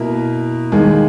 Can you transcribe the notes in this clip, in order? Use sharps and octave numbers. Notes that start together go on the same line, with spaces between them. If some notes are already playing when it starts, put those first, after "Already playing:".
Already playing: B2 A#3 E4 A#4
D#2 D#3 G#3